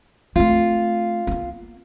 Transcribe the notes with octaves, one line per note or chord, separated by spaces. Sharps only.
A3 C4 F4
A#3 B3